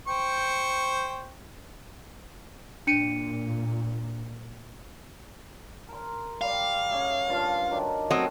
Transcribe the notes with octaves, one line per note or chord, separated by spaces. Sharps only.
C5 G5 C#6
A#2 D4 C#7 D#7
A#4 C6
G3 D5 F5
C#4 G#4 E5
G2 F4 A5
D#3 F#3 D4
F#3 G3 A3 C4 C#4 D#5